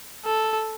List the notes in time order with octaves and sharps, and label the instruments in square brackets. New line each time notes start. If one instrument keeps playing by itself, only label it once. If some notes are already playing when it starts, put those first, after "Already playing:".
[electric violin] A4